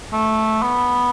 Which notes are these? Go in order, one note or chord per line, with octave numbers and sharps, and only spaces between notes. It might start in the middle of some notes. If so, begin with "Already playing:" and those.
A3
B3